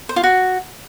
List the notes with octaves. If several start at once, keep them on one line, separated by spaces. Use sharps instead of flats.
C5
F4
F#4